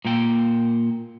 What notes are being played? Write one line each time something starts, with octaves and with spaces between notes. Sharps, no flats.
A#2 A#3 G5